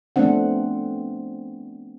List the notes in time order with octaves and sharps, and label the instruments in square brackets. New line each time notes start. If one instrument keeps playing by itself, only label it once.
[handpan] F3 A3 B3 C4 D4 F#5